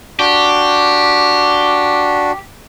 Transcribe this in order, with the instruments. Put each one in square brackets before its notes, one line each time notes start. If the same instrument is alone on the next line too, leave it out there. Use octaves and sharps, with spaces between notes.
[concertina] D4 F#4 [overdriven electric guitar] G4